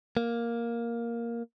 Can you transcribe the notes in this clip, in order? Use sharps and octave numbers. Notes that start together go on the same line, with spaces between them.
A#3